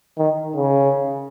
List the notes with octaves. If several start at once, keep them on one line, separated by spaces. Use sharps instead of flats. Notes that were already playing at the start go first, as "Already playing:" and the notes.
D#3
C#3